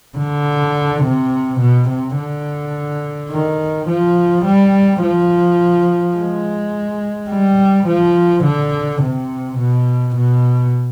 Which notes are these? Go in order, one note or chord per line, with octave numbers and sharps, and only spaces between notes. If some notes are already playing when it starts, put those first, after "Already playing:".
D3
C3
B2
C3
D3
D#3
F3
G3
F3
G#3
G3
F3
D3
C3
B2
B2